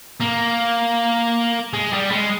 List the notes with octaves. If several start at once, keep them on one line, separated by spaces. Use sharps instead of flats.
A#3
G#3
G3
G#3